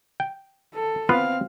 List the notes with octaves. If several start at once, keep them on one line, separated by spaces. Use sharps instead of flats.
G5
A4
B3 C4 F4 B4 F5